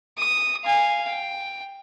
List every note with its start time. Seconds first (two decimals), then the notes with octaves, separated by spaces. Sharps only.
0.18 D#6
0.64 F5 G#5
1.08 G5